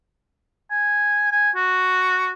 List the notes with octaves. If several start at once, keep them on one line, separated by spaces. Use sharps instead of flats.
G#5
G#5
F#4